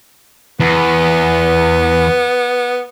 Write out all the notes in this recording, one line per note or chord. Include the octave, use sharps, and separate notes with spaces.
E2 B3